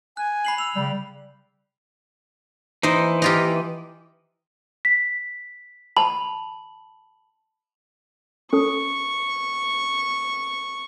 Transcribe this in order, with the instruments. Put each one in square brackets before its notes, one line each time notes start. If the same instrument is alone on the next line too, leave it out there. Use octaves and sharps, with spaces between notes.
[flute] G#5 [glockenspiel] F#6
[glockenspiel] B5 C7 F#7
[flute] E6 [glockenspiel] F7
[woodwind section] C#3 G3
[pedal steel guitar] E3 [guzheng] D#4 C5
[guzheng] D#4 F4 G4
[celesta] B6
[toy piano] A5 B5 [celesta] F#7
[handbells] C#4 A4 D#6 [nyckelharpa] C#6